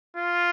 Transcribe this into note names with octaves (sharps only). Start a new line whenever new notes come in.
F4